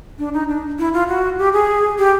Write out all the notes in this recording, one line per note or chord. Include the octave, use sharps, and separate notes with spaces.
D4
D#4
D4
E4
F4
F#4
G4
G#4
G4